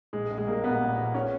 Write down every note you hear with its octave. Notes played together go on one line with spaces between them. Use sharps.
A#1 G#3
A#1
G#3
G3 A#3
A#1 B3
A#2
A#1
C#4